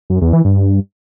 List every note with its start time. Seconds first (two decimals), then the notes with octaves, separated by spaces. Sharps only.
0.10 F#2
0.21 E2
0.33 E3
0.45 G2